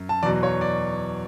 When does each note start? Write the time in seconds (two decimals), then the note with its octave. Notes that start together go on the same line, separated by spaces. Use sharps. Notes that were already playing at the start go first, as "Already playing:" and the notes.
Already playing: F#2
0.09 A5
0.23 E2 B2 F#3 D5
0.43 C#5
0.61 D5